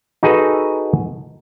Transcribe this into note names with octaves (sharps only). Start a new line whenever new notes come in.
D#4 F#4 G#4 A4 B4